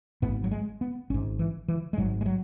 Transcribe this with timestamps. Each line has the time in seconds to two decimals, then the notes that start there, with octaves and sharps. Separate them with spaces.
0.22 G#1 G#2 B3
0.44 F#3
0.51 G#3
0.81 B3
1.10 G#1 C#4
1.14 G#2
1.39 E3
1.68 E3
1.93 G#3
1.97 G#1 G#2 F#3
2.21 G#3
2.26 F#3